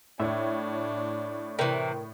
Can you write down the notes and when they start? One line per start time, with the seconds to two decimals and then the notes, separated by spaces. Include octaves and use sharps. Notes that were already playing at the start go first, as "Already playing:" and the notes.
0.20 A2 D4 C#5 E5
1.59 C3 E3 A#4 G5